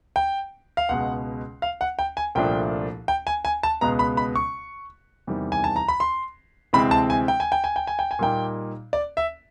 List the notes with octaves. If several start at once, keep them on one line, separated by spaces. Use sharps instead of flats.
G5
F5
C#2 B2 G#3 F#5
F5
F#5
G5
G#5
C2 A#2 F3 A3 D4 G5
G5
G#5
G#5
A5
C#2 B2 G#3 B3 A#5
B5
B5
C#6
E2 C3 D#3 G3
G#5
A5
A#5
B5
C6
D2 C3 E3 G#3 C4 B5
A5
G#5
G5
G#5
G5
G#5
G5
G#5
G5
G#5
A#2 G3 A#3 D#4 G5
D5
E5